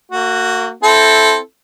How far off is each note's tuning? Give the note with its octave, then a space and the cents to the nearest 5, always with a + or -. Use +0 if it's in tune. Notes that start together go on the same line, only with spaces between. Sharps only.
A#3 -35 F#4 +0
C4 +0 E4 +0 A4 -10